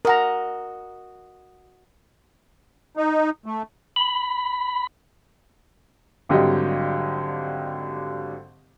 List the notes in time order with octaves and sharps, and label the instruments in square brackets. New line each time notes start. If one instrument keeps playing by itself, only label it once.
[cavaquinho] F#4 D#5 [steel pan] A#4 A#5
[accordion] D#4
A3
[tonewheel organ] B5
[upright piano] G#1 D3 F#3 G3 G4 D#5